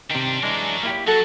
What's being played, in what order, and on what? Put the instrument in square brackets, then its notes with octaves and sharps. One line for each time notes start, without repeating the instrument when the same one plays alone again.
[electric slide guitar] C3 D#3 [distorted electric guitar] G3 D4
[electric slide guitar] E3 G#3 D4 [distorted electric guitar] F#3 A#4
[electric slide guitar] A#3 E4 G4
[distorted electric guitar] F#3 [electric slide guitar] F#4 [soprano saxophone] A4